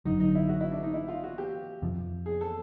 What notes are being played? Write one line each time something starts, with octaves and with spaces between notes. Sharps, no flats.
G#1 F#2 D3 F#3 D#4
D#4
E4
F#4
E4
D4
D#4
E4
F4
F#4
G4
F2 C3 F3
G#4
A4